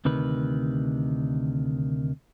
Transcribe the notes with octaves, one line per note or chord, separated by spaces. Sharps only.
D2 C3 D#3 B4